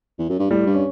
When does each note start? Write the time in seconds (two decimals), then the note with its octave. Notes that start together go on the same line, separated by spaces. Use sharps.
0.19 E2
0.29 F#2
0.39 G2
0.50 A2 G3
0.66 G2
0.75 C#4